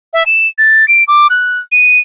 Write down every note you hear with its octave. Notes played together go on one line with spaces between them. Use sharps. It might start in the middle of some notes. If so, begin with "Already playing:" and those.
E5
E7
A6
D7
D6
F#6
D#7